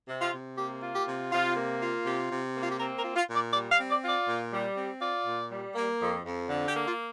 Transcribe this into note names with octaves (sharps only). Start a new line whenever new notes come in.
C3
F4
C3
A#3 G4
F4
G4
C3
C3 F4
A#3
F4
C3 G4
C3
A#3
F4
G4
C4 A#4
A#4
F4
F4
A#2
D5
G3 D5
F5
C4
D5
F4
D5
A#2
G3
C4
F4 D5
A#2
G3
A#3
F2
F2
D3
G4
A#3
F4